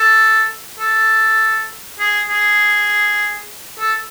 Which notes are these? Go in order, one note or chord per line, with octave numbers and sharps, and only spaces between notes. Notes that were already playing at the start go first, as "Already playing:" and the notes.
Already playing: A4
A4
G#4
G#4
A4